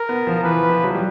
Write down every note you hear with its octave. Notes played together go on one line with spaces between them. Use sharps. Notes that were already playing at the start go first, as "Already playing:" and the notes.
Already playing: A#4
B3
F3
E3 B4
F3
F#3
G3